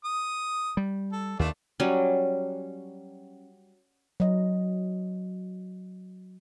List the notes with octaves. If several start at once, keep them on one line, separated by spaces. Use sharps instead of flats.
D#6
G3
A4
D#2 A3 D4 F4
F#3 G3 C#4
F#3 D#5